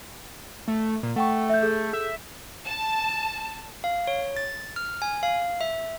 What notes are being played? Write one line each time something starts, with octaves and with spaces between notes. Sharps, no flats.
A3
A#2
A3 F#5 G5 C#6
E5 G6
G#4 A4 G6
E5
A5
F5
C#5
A6
F6
G#5
F5
E5